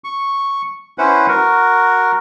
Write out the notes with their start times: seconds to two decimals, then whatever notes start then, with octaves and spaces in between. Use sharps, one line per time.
0.04 C#6
0.98 C#4 E4 B4 C5 F#5
1.28 F#4 A#4